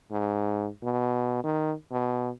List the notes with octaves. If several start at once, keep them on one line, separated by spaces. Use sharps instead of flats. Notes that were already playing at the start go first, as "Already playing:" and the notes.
G#2
B2
D#3
B2